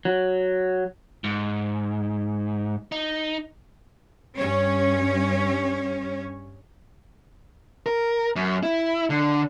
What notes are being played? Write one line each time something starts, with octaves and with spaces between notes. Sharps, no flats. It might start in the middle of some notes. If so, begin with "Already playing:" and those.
F#3
G#2
D#4
G2 C#4 C#5
A#4
F#2
E4
D3